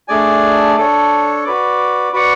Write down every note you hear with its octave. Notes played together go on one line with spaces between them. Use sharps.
A3 D4 G#4 D5 G#5
D4 A4 C#5
F#4 B4 D5
F#4 B4 D5 F#5